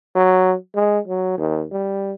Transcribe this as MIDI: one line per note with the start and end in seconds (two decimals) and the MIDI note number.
0.15 0.54 54
0.75 0.99 56
1.07 1.37 54
1.38 1.64 39
1.72 2.13 55